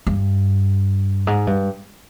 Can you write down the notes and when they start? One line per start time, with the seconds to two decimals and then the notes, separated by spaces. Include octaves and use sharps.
0.07 G2
1.27 G#2
1.47 G2